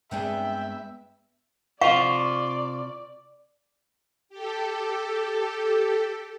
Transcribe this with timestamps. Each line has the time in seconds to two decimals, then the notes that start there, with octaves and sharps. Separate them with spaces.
0.11 G2 G#3 B3 C4 D4 G#4 E5 G5
1.81 C3 F4 C5 D5 F5 C#6
4.29 G4 A4